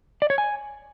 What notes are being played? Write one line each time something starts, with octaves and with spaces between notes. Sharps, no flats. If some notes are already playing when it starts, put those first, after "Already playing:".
D5
C#5
G#5